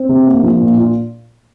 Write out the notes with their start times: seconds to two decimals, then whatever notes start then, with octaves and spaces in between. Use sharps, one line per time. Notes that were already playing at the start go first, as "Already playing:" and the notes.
Already playing: C4
0.09 C3
0.27 A#3
0.43 F3
0.61 A#2
0.77 F4